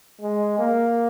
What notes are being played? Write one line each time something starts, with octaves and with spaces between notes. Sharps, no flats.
G#3
A#3